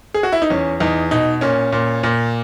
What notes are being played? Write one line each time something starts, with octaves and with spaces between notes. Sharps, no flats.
G#4
F#4
E4
D#4
E2 C#4
E2 D#4
B2 D#4
A#2 C#4
A#2
A#2